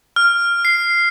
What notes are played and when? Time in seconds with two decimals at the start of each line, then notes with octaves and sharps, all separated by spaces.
0.16 F6
0.65 C7